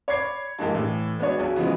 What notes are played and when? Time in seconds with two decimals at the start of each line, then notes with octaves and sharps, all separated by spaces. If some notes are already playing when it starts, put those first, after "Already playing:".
0.08 C#5 D5 B5 D6 G#6 C7
0.59 G2 E3 G#3 A#3 G4
0.75 A2 E3
1.19 G#3 B3 D4 D#4 F#4 C#5
1.38 B1 F#3 G#4
1.56 C#3 E3 F3 G3 G#3 B3